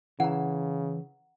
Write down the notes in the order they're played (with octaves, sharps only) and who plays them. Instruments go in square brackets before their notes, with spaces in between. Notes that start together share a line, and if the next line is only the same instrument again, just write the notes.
[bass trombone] C#3 [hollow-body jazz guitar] E3 [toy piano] F#5 A#5